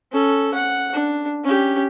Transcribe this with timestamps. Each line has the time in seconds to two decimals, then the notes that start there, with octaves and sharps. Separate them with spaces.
0.12 C#4 A4
0.54 F#5
0.93 D4
1.44 C#4 G4